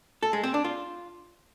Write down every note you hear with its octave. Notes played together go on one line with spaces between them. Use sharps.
A4
G#3
C4
D4
F4